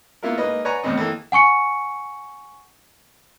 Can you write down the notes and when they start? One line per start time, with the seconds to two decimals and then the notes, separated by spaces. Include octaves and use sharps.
0.23 A#3 B3 E4 F4 A#4
0.38 G#3 A#3 D#4 B4 D#5
0.65 B4 C#5 D5 F#5 G#5 A#5
0.83 E2 A2 E3 B3 C4 D#5
0.96 D#3 E3 A#3 A4
1.32 F#5 G#5 C#6 C#7